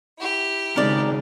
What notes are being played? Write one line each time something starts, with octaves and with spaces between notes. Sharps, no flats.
E4 G4
G#1 C#3 G#3 A#4 D5